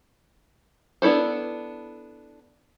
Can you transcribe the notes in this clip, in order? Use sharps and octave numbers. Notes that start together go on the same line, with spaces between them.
B3 D4 E4 A4 C5